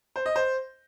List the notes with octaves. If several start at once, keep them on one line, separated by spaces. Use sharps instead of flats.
C5
D#5
C5